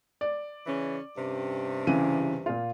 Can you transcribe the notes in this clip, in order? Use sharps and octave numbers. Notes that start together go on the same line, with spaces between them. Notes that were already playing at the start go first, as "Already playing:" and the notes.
D5
C#3 E3 C#4
G2 C3 C#4
C#3 E3 D#7
A#2 F4